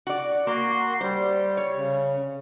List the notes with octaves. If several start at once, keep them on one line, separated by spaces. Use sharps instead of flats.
F#4 D5
A#3 F#4 C6
G3 C5
C#5
C#3